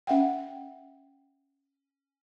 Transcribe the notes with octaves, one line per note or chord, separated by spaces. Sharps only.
C#4 E5 F#5 G5